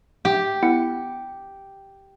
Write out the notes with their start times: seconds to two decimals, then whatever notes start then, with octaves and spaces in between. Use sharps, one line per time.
0.25 G4
0.63 B3 E4 F#5